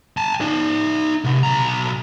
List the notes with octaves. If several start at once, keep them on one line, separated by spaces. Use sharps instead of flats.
G#5 A5
D#4 D5
C3 F#5
B1 A#5